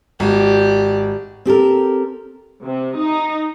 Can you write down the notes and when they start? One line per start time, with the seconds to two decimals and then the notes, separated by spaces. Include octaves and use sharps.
0.20 G#1 G4 D5
1.45 C4 G4 A4 A#4
2.62 C3
2.97 D#4